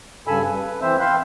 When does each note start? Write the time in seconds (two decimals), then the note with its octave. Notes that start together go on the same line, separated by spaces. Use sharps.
0.27 G2 C#3 A4 G#5 B5 E6
0.44 B4
0.82 E3 C4 C5 E5 E6
1.00 F5 G5 B5 C6 E6 F#6